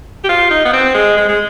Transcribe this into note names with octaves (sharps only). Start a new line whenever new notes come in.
G4
F4
D#4
B3
C4
G#3
G#3
G#3